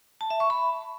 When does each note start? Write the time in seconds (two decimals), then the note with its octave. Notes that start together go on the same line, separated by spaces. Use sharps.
0.21 A5
0.30 E5
0.40 C#6
0.50 B5